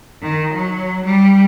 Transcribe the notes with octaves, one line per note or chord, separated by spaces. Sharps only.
D#3
F#3
G3